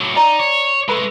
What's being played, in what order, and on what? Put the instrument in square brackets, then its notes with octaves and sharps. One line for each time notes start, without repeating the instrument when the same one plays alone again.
[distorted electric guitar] A2 F#3
[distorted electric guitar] D#4 [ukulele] D5 A#5
[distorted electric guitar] C#5
[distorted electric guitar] G#3 A3 [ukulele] A4 B4 B5